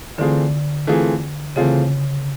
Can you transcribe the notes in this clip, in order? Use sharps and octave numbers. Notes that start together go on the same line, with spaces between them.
D3 E3 A3 C4 F4 G#4
E3 A3 C4 F4 G#4
C#3 E3 A3 C4 F4 G#4